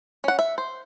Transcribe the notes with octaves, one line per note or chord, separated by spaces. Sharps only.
C#4 F#5
E5
C5